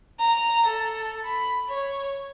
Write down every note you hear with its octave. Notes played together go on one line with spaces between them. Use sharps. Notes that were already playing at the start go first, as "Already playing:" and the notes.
A#5
A4
B5
C#5